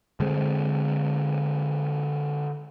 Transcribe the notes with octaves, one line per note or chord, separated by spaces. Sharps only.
D3 G#3 C4